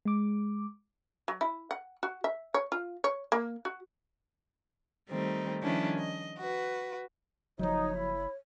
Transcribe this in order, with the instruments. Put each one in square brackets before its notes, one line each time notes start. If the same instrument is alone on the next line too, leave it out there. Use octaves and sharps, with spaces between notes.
[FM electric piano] G#3 D6
[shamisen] F#3
E4
F#5
F#4
E5
C#5
F4
C#5
A#3
F#4
[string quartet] D#3 G3 A3 C4 D#4
D#3 F3 G3 C#4 D4 E4
D#5
F#4 B4
[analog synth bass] F#1 [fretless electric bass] F3 F#3 [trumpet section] D#4 [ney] C#5
[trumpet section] E4 B5